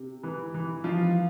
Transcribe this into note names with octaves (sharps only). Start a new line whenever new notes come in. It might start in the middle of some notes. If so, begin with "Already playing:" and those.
Already playing: C3
E3
E3
F3 F4